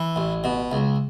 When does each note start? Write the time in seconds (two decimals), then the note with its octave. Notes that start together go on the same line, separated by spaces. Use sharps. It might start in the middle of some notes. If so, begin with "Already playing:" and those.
Already playing: E3
0.16 A1
0.44 B2
0.72 C#2